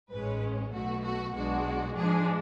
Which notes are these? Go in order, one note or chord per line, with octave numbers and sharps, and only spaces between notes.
A1 G#2 G#3 C#4 B4
B1 B2 A3 F#4
F#4
B1 B2 G#3 D4 F#4
G#2 F3 G#3 D4 G#4